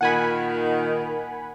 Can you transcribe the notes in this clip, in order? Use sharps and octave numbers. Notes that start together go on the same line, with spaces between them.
A#2 D#3 F#5 G#5 B5